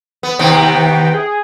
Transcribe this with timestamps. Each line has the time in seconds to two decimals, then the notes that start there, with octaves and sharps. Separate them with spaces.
0.23 B3
0.39 D#2 C3 B3 G5
1.14 G#4